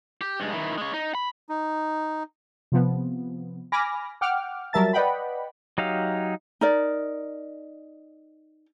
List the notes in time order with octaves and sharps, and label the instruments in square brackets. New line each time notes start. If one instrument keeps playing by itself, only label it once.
[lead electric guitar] G4
G2 G#3
D#3 E4
G#3 C#5
D#4
B5
[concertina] D#4
[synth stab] C3 F3 B3
G#5 B5 D6 F6 A#6
F#5 G5 D6 F6
F#3 G3 A#4 E5 A5 A6
B4 D5 D#5 F#5 G5 B5
[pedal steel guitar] F#3 D#4 G4 F5
[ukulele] D#4 A#4 D5